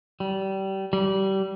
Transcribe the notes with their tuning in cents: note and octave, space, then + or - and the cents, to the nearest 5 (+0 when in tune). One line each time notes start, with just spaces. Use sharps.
G3 -25
G3 -25